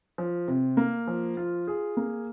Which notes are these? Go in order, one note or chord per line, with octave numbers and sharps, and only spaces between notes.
F3
C3
A#3
F3
F4
G#4
A#3